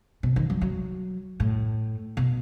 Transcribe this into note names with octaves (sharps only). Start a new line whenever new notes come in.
B2
D#3
F#3
F#3
A2
B2